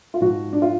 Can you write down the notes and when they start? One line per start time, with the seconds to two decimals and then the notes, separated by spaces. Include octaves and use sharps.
0.14 F4
0.20 G#2 F3 F#4
0.53 D4
0.62 F4